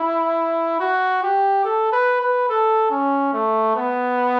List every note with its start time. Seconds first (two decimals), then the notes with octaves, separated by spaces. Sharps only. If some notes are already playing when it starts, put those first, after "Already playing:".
Already playing: E4
0.80 F#4
1.23 G4
1.64 A4
1.92 B4
2.21 B4
2.49 A4
2.91 C#4
3.33 A3
3.76 B3